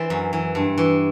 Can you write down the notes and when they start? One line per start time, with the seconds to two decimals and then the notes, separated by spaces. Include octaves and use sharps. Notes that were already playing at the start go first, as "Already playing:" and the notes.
Already playing: E3 C5 D5 E5
0.10 F#2
0.33 E3
0.55 G2
0.78 E3